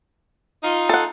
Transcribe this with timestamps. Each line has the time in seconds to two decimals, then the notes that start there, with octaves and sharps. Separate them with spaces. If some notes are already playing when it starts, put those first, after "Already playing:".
0.63 D#4 F4
0.89 A4 F#5